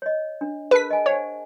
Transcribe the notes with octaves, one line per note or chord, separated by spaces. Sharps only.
C#5 D#5
D4
G#4 A#4 B4 A5 B6
D#5 G#5
C5 C#5 F#5 G#5